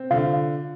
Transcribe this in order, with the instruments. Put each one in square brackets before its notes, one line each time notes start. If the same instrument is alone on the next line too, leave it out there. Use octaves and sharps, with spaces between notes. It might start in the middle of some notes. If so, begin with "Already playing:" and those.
Already playing: [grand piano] C4
[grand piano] D3 [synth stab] F4